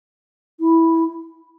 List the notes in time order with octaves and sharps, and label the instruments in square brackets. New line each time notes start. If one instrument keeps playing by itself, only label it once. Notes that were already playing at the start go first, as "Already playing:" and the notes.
[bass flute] E4